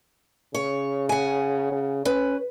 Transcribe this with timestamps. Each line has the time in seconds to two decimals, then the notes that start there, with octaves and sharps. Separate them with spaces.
0.54 C#3 C#5
1.09 F#5 G#5
1.72 C#3
2.05 C#4 B4